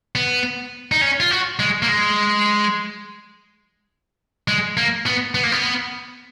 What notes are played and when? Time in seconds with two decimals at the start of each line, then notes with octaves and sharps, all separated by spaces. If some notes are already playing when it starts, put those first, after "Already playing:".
0.15 B3
0.92 D#4
1.01 C#4
1.20 F4
1.31 F#4
1.59 G#3
1.83 A#3
1.88 G#3
4.48 G#3
4.77 A#3
5.06 B3
5.35 B3
5.43 A#3
5.52 B3